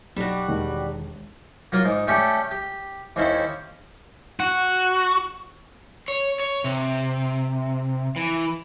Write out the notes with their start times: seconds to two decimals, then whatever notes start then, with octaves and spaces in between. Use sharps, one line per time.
0.16 B1 G3 F#4
0.48 E1 D#3
1.72 F#3 A#3 F4
1.85 G#2
2.07 A3 C#4 G4 A4 D5
2.51 G4
3.16 D#2 C4 C#4 E4
4.40 F#4
6.08 C#5
6.40 C#5
6.64 C3
8.16 E3